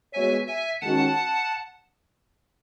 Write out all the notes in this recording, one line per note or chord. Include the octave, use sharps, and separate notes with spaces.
G#3 B3 F#4 C#5 E5 G#5
E5 G#5
D#3 G#3 C#4 F#4 F#5 A5